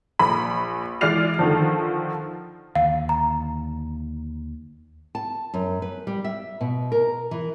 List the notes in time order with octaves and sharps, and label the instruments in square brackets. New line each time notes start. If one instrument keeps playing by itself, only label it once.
[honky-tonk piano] A#1 B5
E3 G#3 D5 F6 C7 F7
D3 D#3 F3
[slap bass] D#2 D3 [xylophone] F5
[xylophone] A#5
[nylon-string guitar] A5
F#2
B4
G3
E5
B2
A#4
E3